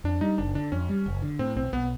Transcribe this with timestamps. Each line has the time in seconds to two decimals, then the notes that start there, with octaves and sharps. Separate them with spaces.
0.04 F2 D4
0.21 G3 D#4
0.38 F#1 D4
0.54 D3 D4
0.72 F2 C#4
0.89 G3
1.06 F#1
1.22 D3
1.39 A2 C4
1.56 B1 C4
1.72 B1 B3